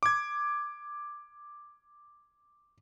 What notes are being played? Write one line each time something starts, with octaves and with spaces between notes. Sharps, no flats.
D6 G#6